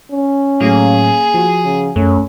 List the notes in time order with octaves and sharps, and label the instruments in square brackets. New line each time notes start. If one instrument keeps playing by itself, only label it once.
[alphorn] C#4
[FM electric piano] A2 F#3 A3 [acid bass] A#3 [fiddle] G#4
[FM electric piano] F3 F#4
[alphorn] C#3
[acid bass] F#2 [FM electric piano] A3 [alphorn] C#4